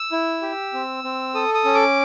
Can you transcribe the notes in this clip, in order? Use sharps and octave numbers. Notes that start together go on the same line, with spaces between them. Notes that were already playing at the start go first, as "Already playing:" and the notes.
Already playing: E6
E4
G4
C4
C4
A4 D#6
D#6
C#4
D6